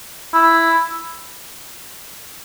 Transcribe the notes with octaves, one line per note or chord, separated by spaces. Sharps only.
E4